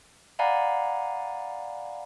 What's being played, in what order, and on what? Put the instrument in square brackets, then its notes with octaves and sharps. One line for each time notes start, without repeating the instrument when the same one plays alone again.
[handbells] D5 F5 F#5 G#5 A#5 B5